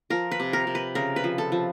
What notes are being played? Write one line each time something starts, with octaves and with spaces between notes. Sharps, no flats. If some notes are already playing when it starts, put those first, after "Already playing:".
F3 A#4
B4
C3
A#4
C3
B4
C#3 A#4
B4
F3
A4
F3